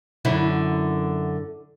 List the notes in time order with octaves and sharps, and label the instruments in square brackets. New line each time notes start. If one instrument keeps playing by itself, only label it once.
[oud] F#2 D3 E4